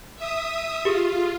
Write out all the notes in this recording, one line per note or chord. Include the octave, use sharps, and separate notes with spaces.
E5 D#6
F4 G4 G#4